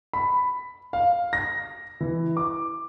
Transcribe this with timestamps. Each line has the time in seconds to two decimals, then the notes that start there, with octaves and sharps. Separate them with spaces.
0.13 B5
0.93 F5
1.33 A#6
2.01 E3
2.37 D6